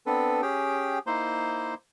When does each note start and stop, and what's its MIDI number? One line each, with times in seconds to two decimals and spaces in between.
0.06 0.41 59
0.06 0.41 60
0.06 0.41 62
0.06 0.41 69
0.06 0.41 71
0.42 0.99 61
0.42 0.99 67
0.42 0.99 68
0.42 0.99 79
1.07 1.74 58
1.07 1.74 63
1.07 1.74 64
1.07 1.74 72
1.07 1.74 84